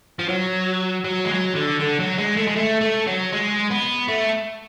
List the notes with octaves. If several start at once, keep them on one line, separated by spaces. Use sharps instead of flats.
F3
F#3
F#3
G#3
F#3
D3
D3
F#3
G#3
A3
G#3
A3
A3
F#3
G#3
B3
A3